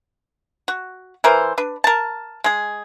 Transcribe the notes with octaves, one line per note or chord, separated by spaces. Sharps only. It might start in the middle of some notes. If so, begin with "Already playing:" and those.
F#4
E3 A#4 C5
D4 B4
A#4 A5
G#3 G#4